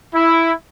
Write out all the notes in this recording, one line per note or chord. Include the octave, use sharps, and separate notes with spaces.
E4